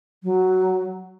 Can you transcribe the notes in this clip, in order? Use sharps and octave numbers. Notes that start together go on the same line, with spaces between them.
F#3